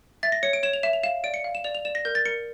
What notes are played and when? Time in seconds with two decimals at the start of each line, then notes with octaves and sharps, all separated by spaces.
0.23 E5 A6
0.32 A#6
0.43 C#5 C#7
0.53 D7
0.63 C#5 E7
0.73 F7
0.83 E5 E7
0.93 F7
1.03 F5 E7
1.24 D5 D7
1.34 C#7
1.44 F5
1.55 E7
1.64 D5 F7
1.75 F7
1.85 D5 E7
1.95 A#6
2.05 A#4 G6
2.15 A6
2.25 A#4 C#7